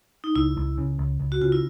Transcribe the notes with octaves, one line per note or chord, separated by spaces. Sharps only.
D#4
C#2 E4
C#2
C#3
C#2
C#2
F#4
C#3 F4
E4